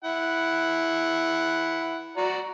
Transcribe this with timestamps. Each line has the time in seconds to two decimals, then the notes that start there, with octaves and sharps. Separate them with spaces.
0.04 E4 F#5
2.17 F#4 D5 A#5